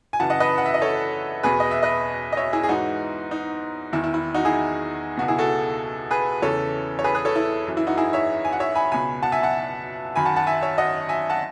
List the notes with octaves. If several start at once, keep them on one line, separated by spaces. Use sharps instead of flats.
G#5
F#2 C#3 E3 F#5 A5
D#5 F#5
B4 D#5
F#5
E5
D#5
A4 C#5
E2 B2 G#4 B4
D#5
E5
B4 D#5
D#5
C#5 E5
E4 G#4
G#4
G#2 E3 D#4 F#4
D#4
E2 D#3 E4
E4
E4
D#4 F#4
E4 G#4
C#2 B2 F#4
E4 G#4
F#4 A4
G#4 B4
E2 C#3 E3 A4 C#5
C#5
G#4 B4
G#4 B4
A4 C#5
E4
F#2 E3
E4
D#4 F#4
E4 G#4
C#5 E5
G#5
F#5
C#5 E5
G#5 B5
C#2 B2 G#5 B5
F#5 A5
E5 G#5
F#5 A5
F#2 D#3 G#5 B5
F#5 A5
F#5 A5
E5 G#5
C#5 E5
D#5 F#5
E5 G#5
F#5 A5